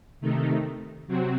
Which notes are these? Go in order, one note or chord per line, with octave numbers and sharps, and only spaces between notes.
C3 D#3 A3 D#4
C3 F#3 C4 F#4